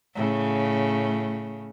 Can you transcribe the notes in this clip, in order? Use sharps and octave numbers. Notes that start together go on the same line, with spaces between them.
A2 C#3